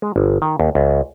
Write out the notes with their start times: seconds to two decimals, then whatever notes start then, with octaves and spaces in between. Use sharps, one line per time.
0.02 G#3
0.16 G1
0.42 D#3
0.60 D#2
0.75 C#2